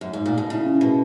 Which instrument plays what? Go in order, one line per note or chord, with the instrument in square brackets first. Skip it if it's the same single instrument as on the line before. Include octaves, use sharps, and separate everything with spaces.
[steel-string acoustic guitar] F#2
G#2
A#2
B2
[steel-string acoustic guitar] C#3 [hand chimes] E4
[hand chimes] C#4
[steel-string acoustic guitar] B2 [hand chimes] A#4